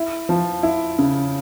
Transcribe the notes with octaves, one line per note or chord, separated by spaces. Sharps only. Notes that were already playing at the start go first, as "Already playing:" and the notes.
Already playing: E4
F3
E4
C#3